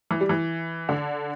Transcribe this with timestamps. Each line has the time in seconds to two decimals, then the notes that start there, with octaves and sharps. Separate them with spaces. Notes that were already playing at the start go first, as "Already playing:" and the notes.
0.11 E3
0.21 G3
0.29 E3
0.89 D3